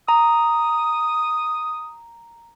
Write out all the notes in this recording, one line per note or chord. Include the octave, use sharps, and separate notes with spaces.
A#5 D#6